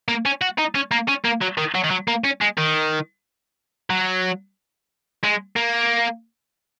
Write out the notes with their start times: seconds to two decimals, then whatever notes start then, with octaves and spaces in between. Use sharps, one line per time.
0.08 A#3
0.25 C#4
0.41 F#4
0.58 D#4
0.75 C#4
0.91 A#3
1.08 C#4
1.25 A#3
1.41 F#3
1.58 D#3
1.75 F#3
1.84 D#3
1.91 F#3
2.08 A#3
2.24 C#4
2.41 G#3
2.57 D#3
3.90 F#3
5.24 G#3
5.56 A#3